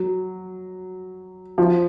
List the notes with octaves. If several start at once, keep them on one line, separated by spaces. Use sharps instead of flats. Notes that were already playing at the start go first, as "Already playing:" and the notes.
Already playing: F#3
F3